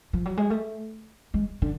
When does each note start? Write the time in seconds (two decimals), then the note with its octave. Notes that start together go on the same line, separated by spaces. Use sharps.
0.13 F3
0.26 F#3
0.37 G#3
0.50 A3
1.34 G#3
1.62 D3